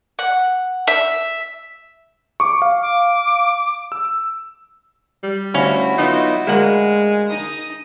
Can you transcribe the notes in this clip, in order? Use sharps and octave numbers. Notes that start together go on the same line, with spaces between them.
F#5
E5
C#6 D6
F5
D6
E6
G3
D2 C#4 E4 F#4 F5
F#3 B3 D#4 F4
D2 G#3 A#3 F#5
D#4 D#6